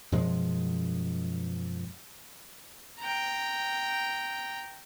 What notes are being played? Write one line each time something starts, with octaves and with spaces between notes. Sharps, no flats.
F#2 B2 F3 G#3
G5 A#5